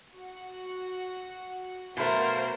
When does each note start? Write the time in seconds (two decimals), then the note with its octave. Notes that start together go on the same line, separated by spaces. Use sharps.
0.13 F#4 F#5
1.97 B2 A3 A#4 C5 F5 F#5